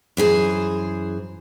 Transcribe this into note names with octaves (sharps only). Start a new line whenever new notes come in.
F#2 E3 G#4 C5